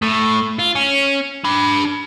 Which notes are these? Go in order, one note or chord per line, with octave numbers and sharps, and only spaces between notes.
A2
F4
C#4
D4 B5